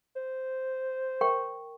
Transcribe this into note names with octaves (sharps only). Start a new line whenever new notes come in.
C5
A#4 G5 C#6